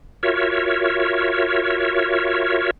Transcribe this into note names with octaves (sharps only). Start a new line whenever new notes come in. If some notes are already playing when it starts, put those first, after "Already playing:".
F4 F#4 A#4 C#5 E5